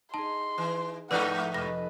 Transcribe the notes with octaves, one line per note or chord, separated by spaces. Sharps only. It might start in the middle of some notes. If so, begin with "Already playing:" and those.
D#4 G#4 A5 C6
E3
G#2 F3 A3 D#4 B4 D5 F#5 F#6
F1 A4 B4 D#5 A#6